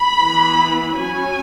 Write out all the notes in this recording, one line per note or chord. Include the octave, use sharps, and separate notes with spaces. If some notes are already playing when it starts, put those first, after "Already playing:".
Already playing: B5
E3 B3
F#3 C#4 G#5